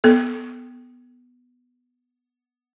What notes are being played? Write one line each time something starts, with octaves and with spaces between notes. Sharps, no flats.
B3 A4